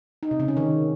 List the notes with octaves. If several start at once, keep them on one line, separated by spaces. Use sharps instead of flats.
D#4
C3
C#3
C#4
D#3